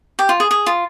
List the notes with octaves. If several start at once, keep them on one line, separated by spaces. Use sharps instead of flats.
G4
F4
G#4
G#4
F4